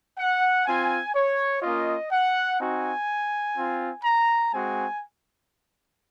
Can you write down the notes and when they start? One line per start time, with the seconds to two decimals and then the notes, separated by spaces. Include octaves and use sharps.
0.18 F#5
0.66 C4 F4 G#5
1.14 C#5
1.62 A#3 C#4 F4 D#5
2.11 F#5
2.59 C4 D#4 F#4 G#5
3.56 C4 F4
4.04 A#5
4.52 G#3 C4 F#4 G#5